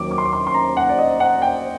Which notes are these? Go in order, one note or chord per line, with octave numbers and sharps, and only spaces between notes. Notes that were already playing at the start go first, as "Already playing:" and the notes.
Already playing: D#2 D#3 F#3 D6
D6
C6
D6
C6
C6
A#5
F#5
D5
D#5
F#5
G5